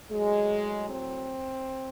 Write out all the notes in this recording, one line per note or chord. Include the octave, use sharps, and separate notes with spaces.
A2 F#3 G#3
C4